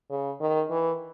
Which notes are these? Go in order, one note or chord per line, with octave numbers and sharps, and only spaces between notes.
C#3
D#3
E3